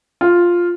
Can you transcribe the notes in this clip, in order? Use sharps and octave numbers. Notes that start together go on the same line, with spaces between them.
F4